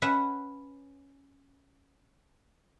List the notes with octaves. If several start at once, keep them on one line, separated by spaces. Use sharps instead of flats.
C#4 B4 E5 F#5